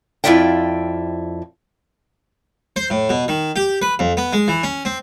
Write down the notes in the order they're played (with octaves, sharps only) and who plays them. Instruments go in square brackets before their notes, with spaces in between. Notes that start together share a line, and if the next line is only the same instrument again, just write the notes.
[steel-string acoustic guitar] F2 E4 F4 D5 E5 G5
[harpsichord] C5
A2
B2
D#3
G4
B4
F2
B3
G#3
E3
C#4
C4